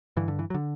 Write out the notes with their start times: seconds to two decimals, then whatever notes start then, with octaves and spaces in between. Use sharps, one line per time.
0.17 G2 D3 E3
0.28 D3
0.39 E3
0.50 F#3
0.54 D3